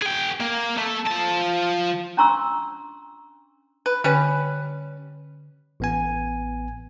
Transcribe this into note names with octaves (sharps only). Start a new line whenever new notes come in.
G#4 G5
A#3
A3
F3 A5
C#4 D4 A#5 C6 C#6 E6
B4
D3 G3 C#4 B4
A1 B3 G#5